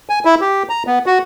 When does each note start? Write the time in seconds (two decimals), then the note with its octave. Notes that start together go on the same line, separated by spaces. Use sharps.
0.09 G#5
0.25 E4
0.41 G4
0.69 A#5
0.87 B3
1.06 F#4